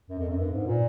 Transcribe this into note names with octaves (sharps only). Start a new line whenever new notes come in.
F#2
F2
F#2
G2
G#2
A#2